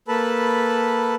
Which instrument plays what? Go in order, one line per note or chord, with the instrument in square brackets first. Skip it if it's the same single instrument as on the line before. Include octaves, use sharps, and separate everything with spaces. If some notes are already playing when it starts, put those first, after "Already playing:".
[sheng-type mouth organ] A#3 A4 B4 A5 B5